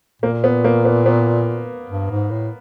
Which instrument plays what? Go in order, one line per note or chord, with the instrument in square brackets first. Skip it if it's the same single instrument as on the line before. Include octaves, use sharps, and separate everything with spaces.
[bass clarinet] A#2 [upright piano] A#3
[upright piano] B3
A#3
B3
B3
[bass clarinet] G2
G#2
A2